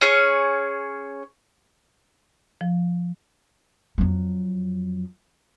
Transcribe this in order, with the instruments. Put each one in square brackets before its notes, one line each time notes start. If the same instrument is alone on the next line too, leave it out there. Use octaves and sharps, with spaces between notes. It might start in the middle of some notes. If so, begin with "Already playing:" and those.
[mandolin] C#4 G#4 C#5
[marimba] F3
[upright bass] F2 F#3